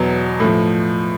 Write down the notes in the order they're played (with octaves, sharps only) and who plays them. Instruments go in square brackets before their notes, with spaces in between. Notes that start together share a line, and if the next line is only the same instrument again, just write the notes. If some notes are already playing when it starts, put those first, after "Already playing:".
Already playing: [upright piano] E2 B2 F#3
A2 F3